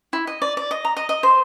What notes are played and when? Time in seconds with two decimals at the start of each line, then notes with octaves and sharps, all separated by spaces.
0.13 E4
0.27 D#5
0.42 D5
0.57 D5
0.71 D#5
0.85 A#5
0.97 D#5
1.09 D#5
1.23 C5